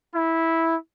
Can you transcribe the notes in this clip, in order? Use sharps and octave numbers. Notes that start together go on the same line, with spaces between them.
E4